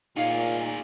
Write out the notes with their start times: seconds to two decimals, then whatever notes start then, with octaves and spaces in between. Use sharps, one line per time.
0.17 A#2 D#4 F4 G#4 C#5 F5 F#5